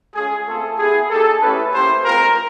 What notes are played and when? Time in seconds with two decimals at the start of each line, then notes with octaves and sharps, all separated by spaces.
0.14 G#3 C#4 F4 G#4
0.46 A3 C4 F4 A4
0.78 B3 E4 G4 G#4
1.10 A#3 D#4 G4 A4
1.41 A3 C#4 E4 G4 B4
1.73 A#3 C#4 E4 G4 C5
2.05 G#3 C4 F4 A#4